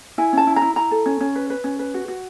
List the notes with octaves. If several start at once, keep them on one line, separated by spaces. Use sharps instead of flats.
E4 G#5
C#4 A5
E4
A#5
E4
E4 A#5
A4
C#4
C#4
B4
B4
C#4
B4
F#4
F#4